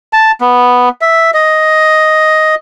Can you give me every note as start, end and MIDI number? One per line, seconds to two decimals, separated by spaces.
0.13 0.32 81
0.41 0.89 59
1.01 1.31 76
1.34 2.55 75